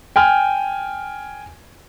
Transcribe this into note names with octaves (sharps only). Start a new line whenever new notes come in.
G5 G#5 F6